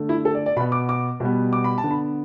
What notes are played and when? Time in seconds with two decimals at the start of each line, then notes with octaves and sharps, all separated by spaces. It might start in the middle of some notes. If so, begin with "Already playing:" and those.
Already playing: D3 A3
0.09 E4
0.25 A4
0.35 D5
0.46 D5
0.56 B2 B5
0.60 B3
0.72 D6
0.89 D6
1.20 B2 G3 B3
1.53 D6
1.64 B5
1.78 A5
1.84 D3 B3
1.91 B5